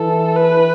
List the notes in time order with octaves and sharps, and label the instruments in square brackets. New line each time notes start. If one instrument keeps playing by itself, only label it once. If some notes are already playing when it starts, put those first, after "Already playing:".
Already playing: [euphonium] E3 [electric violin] A4
[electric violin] B4